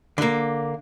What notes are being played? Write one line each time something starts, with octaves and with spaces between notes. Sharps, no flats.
D3 A#3